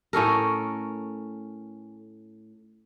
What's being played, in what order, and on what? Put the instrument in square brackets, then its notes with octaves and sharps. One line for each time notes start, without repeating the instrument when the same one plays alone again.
[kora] A2 C#4 A4 A#4